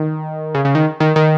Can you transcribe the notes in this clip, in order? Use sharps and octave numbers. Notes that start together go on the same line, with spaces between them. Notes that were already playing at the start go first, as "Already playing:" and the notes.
Already playing: D#3
C#3
C#3
D#3
D#3
D#3